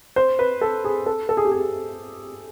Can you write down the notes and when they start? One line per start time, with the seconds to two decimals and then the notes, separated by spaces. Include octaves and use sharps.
0.16 C5
0.39 B4
0.61 A4
0.85 G#4
1.06 A4
1.29 A4
1.37 G#4
1.45 G4
1.52 G#4